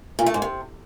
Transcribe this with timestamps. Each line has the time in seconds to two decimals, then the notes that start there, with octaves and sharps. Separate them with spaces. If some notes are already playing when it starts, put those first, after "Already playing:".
0.19 A#2
0.26 A3
0.34 G#2
0.42 C3